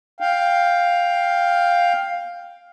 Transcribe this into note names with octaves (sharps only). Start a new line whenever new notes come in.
F5 G5